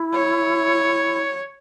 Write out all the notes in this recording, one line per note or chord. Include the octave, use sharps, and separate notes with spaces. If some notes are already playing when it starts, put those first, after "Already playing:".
Already playing: E4
C#5